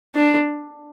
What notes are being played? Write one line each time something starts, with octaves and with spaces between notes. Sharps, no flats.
D4